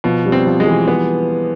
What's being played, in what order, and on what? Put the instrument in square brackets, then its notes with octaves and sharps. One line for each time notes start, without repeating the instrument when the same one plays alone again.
[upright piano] B2 [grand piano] F3
[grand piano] G3
[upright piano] C4
[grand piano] F3
[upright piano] G#3
[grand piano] E3
[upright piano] B3